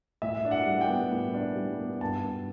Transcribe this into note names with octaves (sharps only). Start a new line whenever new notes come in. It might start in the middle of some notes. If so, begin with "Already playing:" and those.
A2 E5
D4
F#5
G3
G5
B3
A2
D4
G3
B3
G2 A5
G2